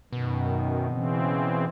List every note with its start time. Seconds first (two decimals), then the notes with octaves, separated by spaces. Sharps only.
0.12 F#2 B2 D#3
0.88 C#3 E3 C4